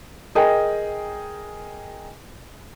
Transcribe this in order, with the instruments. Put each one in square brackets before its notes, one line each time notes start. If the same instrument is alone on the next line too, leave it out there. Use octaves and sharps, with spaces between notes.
[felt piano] G#4 A#4 D#5 G5 G#5